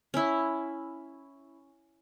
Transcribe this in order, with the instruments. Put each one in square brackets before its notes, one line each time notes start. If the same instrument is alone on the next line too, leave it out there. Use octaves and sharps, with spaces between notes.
[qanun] C#4 E4